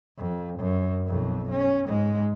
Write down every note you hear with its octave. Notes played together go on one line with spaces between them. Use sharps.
F2
F#2
B1 F2
C#4
G#2 G#3